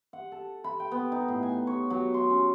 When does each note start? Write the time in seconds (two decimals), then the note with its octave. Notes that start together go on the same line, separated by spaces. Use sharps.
0.13 F#5
0.32 A4
0.64 B5
0.80 G5
0.92 B3
1.12 D#4
1.28 A2
1.43 G#5
1.67 C#5
1.90 F#3
2.14 C6
2.30 C#4